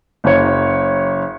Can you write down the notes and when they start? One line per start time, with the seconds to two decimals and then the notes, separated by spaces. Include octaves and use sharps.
0.24 F#1 F#2 C#5